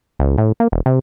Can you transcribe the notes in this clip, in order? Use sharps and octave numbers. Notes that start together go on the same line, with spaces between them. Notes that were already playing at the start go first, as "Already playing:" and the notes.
C#2
A2
A#3
E1
C3